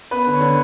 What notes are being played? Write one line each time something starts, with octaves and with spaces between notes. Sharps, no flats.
B3 B4
D3
C#5
D3